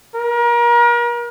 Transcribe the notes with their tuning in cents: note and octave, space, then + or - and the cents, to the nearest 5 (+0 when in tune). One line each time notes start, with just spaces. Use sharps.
A#4 +35